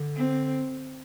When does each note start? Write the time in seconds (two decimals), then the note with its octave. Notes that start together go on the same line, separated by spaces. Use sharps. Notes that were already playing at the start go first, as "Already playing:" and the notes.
Already playing: D3
0.16 C4